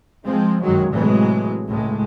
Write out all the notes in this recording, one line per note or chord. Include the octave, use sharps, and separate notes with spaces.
F3 G#3 C4
F#2 D#3 F#3 G#3
A2 C3 E3 F#3 G#3
C#2 A2 G#3